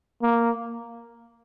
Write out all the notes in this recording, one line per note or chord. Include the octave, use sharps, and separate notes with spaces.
A#3